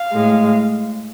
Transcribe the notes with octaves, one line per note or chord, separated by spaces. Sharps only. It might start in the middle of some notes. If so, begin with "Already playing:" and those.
Already playing: F5
A2 G#3